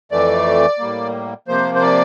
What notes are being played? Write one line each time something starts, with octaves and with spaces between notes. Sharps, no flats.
F2 E3 A3 D5
A2 G3 A#3
C3 F3 A#3 C5
C5
D5